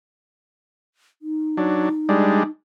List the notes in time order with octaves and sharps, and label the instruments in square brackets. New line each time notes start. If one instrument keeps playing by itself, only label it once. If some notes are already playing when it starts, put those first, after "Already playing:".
[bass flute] D#4
[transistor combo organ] F#3 D4
G3 G#3 D4